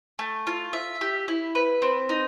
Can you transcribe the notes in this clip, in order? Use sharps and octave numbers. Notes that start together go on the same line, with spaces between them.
A3
F4
E5
G4
E4
B4
C4
D#4